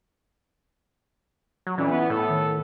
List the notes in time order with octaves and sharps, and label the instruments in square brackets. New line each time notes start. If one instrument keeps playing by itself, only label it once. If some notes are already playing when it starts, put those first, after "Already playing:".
[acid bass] F#3
[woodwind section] F2 A#2 [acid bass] E3 [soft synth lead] C#4
[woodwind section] B3 [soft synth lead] E4
[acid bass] A2 [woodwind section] B3 A4
[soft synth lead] D#3